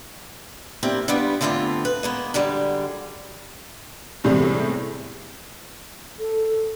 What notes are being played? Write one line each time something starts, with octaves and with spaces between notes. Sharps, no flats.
A#3 C4 D4 E4 G4
G3 B3 D4 F4
D3 G3 A3 B3 C4 F4
B4
G#3 A#3 B3
F#2 D3 G3 G#3
E2 A2 C3 G3 G#3 C4
A4